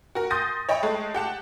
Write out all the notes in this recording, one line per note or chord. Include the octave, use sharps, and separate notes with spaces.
F#4 A#4
C6 D#6 G6 A6 A#6 D#7
C#5 D#5 E5 G5 B5
G#3 A3
G4 F#5 A5